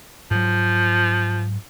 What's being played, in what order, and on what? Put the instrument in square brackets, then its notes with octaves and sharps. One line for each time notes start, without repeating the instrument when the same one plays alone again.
[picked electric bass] G#2 F#3 [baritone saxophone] F3